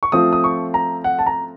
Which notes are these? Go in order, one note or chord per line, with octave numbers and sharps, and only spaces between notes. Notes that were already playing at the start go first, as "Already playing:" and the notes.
C#6
F3 A3 C4 F4 D#6
D#6
C#6
A#5
F#5
A5
A#5